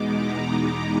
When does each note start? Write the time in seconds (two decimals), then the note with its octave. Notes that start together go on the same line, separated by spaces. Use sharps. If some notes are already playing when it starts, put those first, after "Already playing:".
Already playing: E2 B2 G#3 B3 D#4 D6
0.13 A#5
0.45 D6